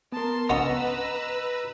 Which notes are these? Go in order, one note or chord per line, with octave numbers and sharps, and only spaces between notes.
B3 A#4 A5 C6
B3 C#4 B4 D#5 A#5 E6